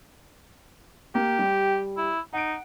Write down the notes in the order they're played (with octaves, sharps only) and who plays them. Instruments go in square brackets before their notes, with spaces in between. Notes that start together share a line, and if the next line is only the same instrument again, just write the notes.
[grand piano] A#3 [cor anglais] G4
[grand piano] G3
[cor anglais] E4
[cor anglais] D#4 [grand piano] F#5 D7